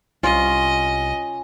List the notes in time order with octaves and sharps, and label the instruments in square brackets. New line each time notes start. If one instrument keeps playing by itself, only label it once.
[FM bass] C2 [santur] C#4 [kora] F4 [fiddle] D#5